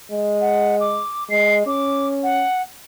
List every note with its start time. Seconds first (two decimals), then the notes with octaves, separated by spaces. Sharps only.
0.12 G#3
0.41 F#5
0.80 D6
1.30 G#3 C7
1.67 C#4 D6
2.23 F#5